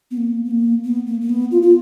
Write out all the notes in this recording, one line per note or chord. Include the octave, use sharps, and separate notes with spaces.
B3
A#3
B3
A#3
B3
A#3
A#3
B3
F4
F4